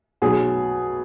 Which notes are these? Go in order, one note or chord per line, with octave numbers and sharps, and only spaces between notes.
B1 B2 F#3 G#4